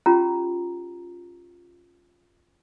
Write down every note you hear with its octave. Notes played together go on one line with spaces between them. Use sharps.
C#4 F4 G4 A#5